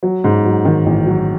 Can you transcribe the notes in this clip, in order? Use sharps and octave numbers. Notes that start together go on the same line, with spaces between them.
F#3
G#2
F#3
D#3
A1
F#3